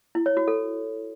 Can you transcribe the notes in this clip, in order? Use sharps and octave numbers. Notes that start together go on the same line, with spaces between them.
E4
C#5
F#4
A4